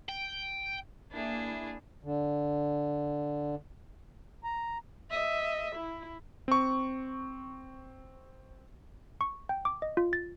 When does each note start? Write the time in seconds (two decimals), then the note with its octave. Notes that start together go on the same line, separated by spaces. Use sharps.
0.09 G5
1.12 A#3 D4 E4 G#4
2.04 D3
4.44 A#5
5.11 D#5 E5
5.76 E4
6.48 C4 C#6
9.21 C#6
9.49 G5
9.65 D6
9.82 D#5
9.97 F4
10.13 A6